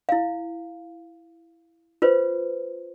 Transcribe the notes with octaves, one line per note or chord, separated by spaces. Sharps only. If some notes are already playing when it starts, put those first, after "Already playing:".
E4 F5
F4 B4 C5